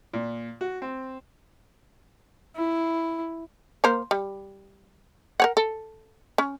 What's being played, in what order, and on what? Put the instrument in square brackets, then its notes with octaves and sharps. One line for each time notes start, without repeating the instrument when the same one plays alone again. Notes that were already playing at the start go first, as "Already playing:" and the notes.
[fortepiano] A#2
F#4
C4
[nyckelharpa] E4
[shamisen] A#3 A#4 C5
G3
A#4 C#5 F#5
A4
C#4